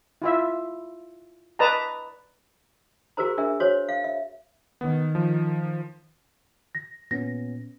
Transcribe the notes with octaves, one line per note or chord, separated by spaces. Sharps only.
E4 F4 E5
B4 D5 D#5 A5 A#5
F#4 G#4 A#4 C5 A#5
D4 G#4 A#4 E5
F#4 C5 C#5
F5
E5
D#3 B3
F3
A#6
A#2 B3 C#4 A#6